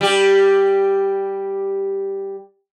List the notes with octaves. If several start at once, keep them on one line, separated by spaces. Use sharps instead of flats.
G3 G4